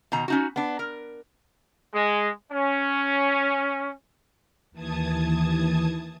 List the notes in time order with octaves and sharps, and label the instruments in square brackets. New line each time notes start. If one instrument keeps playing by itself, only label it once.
[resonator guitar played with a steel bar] B2 D#3 A#5
C#4 D#4 F#4
B3 D4
A#4
[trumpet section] G#3
C#4
[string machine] D#2 E3 A5 D#6 G#6